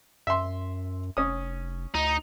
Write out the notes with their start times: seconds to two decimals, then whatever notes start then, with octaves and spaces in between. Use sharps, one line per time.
0.27 F#2 E5 C6
1.17 F1 C#4 D#6
1.94 D2 D#4